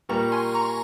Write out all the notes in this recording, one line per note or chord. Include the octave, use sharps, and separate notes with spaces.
A#2 G3 A#3 A#5 C#6
G#5 C6
A#5 C#6